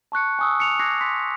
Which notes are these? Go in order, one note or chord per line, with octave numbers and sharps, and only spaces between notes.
A5 C#6 F#6 C#7
G#5 C#6 D#6 E6
C#7 F7
D6 F#6 G#6 A#6 C7
C6 B6